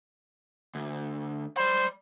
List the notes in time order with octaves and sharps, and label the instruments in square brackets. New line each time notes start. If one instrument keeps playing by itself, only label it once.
[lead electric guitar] D2
[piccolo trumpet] C5 [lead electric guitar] D5 B5